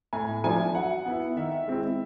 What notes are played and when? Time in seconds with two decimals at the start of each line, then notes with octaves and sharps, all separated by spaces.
0.13 A2 G#5
0.44 F3 A3 D4 G#5
0.75 F#3 F#5
1.06 B3 E4
1.36 D#3 E5
1.68 G#3 C4 E4